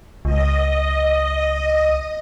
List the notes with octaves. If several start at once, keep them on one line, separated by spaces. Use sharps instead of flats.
C#2 D#5